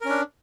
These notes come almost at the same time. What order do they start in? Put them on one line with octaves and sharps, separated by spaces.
A#4 C#4 D4